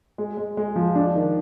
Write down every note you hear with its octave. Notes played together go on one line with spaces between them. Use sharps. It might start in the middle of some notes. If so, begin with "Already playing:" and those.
G#3
G#3
G#3
F3
D4
D#3